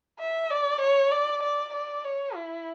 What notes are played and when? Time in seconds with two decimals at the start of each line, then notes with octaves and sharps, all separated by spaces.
0.19 E5
0.50 D5
0.81 C#5
1.11 D5
1.43 D5
1.73 D5
2.04 C#5
2.35 E4